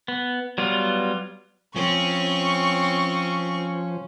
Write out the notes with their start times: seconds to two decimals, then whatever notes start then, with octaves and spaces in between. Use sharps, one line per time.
0.08 B3
0.58 F#3 G3 B3 F4
1.76 F3 C4 C#4 C#6